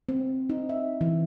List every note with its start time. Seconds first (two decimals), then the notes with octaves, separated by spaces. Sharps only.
0.09 C4
0.50 D#4
0.69 E5
1.01 E3